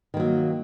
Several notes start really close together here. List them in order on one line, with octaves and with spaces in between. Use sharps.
D#3 A#3 F#3